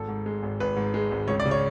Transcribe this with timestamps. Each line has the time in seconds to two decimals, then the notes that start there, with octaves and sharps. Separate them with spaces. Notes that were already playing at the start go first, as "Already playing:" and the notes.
Already playing: G#1 A4
0.08 G#2
0.26 G#3
0.43 G#1
0.60 G#1 B4
0.76 G#2
0.94 G#3
1.11 G#1
1.28 C#2 C#5
1.40 D5
1.46 C#3
1.51 C#5